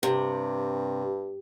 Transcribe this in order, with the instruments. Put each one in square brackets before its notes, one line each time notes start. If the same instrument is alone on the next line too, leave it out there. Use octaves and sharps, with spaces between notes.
[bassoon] G2 [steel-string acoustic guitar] C3